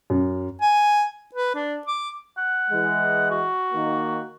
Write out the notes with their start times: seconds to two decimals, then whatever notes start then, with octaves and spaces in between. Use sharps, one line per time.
0.10 F#2
0.61 G#5
1.34 B4
1.55 D4
1.87 D6
2.38 F#5
2.70 E3 G#3
3.31 F#4
3.73 D#3 A#3